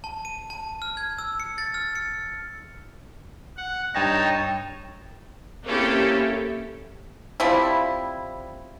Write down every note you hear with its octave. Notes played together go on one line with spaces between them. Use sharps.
A5
D#7
A5
F6
G#6
E6
C#7
A6
F6
C#7
F#5
G2 D#4 C#5 G5 A5 A#6
A#3 C4 C#4 E4 G4 A4
F3 G3 C4 E4